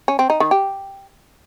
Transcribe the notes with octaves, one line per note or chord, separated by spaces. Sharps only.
C#4
C4
D#4
D#3
G4